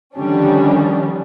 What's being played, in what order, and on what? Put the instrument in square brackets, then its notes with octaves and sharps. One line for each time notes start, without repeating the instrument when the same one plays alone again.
[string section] D3 D#3 F3 G3 C#4 D4